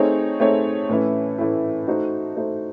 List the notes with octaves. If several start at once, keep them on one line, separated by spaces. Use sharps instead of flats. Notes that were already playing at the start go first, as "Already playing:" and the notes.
Already playing: A3 C4 D#4 G#4 C#5
A3 C4 D#4 G#4 C#5
A2 E3 A3 C#4 E4
A2 E3 A3 C#4 E4
A3 D#4 F#4 C5
A3 D#4 F#4 C5